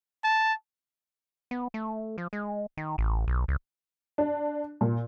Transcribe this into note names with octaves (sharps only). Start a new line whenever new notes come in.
A5
B3
A3
F3
G#3
D#3
A1
B1
C#2
D4
A#2